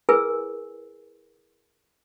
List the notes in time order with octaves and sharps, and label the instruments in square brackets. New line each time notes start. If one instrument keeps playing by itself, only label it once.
[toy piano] E4 G#4 A#4 B4 G#5 E6